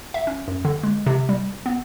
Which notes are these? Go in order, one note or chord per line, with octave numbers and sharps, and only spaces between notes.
E5
C#4
F#2
D3
G#3
C3
G3
B3